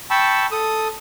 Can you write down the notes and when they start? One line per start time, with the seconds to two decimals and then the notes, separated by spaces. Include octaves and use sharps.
0.10 G5 A5 B5 C#6 E6
0.52 A4 D#6